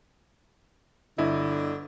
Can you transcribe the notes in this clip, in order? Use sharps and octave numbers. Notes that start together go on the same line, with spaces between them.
G1 D3 E4 D#5